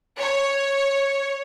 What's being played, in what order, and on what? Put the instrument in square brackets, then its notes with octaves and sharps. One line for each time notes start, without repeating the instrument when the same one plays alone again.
[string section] C#5